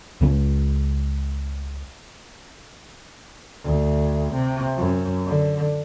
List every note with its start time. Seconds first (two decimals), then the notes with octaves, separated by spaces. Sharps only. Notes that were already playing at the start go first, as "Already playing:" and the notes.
0.21 C#2 C#3 G3 G#3
3.64 D2
4.33 C3
4.76 F#2
5.26 D3